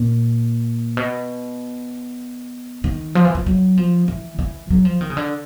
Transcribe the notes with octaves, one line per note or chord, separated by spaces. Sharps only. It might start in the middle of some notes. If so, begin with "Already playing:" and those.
Already playing: A#2
B2
D#3
F3
E3
F3
F#3
F3
E3
E3
F#3
F3
D#3
C#3
D3